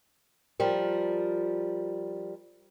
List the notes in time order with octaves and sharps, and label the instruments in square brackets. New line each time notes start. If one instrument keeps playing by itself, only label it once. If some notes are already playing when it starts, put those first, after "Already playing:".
[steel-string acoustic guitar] F3 G3 A#4